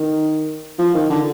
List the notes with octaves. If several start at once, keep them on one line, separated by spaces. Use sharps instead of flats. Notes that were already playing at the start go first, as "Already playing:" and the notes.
Already playing: D#3
F3
D#3
D3